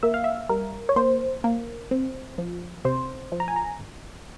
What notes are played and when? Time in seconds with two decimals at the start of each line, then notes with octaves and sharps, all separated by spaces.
0.03 A#3 E5
0.14 F5
0.24 E5
0.49 G3 A#4
0.89 C#5
0.96 A#3 C5
1.44 A#3
1.91 C4
2.38 F3
2.85 C3 C5
3.32 F3
3.40 A#5
3.48 G#5
3.56 A#5
3.79 G#1